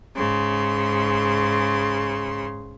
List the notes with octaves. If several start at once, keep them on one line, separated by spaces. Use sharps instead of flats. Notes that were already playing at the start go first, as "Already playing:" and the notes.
G#2 C#3 C6